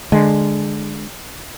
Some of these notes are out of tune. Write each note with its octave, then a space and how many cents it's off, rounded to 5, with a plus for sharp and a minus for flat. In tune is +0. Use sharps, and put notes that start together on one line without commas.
D3 +10 G#3 +0